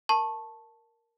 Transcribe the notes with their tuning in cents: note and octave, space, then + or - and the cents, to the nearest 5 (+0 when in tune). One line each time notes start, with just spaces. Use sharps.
A#4 +0 A5 +0 C#6 -20